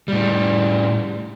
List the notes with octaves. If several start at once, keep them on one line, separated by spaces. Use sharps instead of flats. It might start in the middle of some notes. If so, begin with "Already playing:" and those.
A2 G3